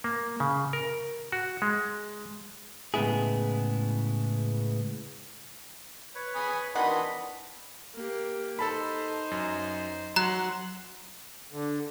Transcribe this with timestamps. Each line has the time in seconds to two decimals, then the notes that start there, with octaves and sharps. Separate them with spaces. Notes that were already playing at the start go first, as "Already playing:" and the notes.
0.04 A#3
0.40 C#3
0.73 A#4
1.32 F#4
1.62 G#3
2.94 A2 C#3 G#3 B3 E4 G#4
6.15 B4 C#5
6.35 G#5 B5 D#6
6.75 D#3 E3 D4 F#4 F#5 B5 C6 D#6
7.95 A#3 G4
8.59 D#4 A4 C5 A5 B5
9.31 F#2
10.16 F#3 F#5 A#5 C6 F#6
11.52 D3